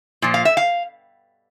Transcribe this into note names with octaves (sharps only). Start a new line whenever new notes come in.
A#2 F3
F5
E5
F5